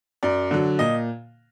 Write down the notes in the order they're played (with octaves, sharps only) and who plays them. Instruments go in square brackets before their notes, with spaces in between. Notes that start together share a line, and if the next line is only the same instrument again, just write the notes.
[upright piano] F#2 D5
D3 F#3
A#2 D#5